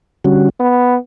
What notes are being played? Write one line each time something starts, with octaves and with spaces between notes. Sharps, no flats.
D3 G3 C#4 F#4
B3